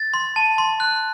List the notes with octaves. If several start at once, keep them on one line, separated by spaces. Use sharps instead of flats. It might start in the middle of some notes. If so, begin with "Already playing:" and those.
Already playing: A6
C6
A5
C6
F#6